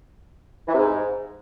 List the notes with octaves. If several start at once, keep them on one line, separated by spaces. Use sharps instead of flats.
E3
C3
G#2